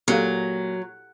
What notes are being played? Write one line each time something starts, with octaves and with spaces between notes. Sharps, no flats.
A#2 F#3 G4 A4 F5